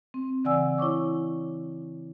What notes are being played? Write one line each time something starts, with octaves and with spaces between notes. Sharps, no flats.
C4
C#3 E3 D5 F#5 G#5 E6
E4 C#5 C#6 D6